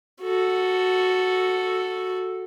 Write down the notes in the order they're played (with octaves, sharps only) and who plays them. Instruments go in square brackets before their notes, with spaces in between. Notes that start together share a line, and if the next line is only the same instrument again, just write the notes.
[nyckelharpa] F#4 A4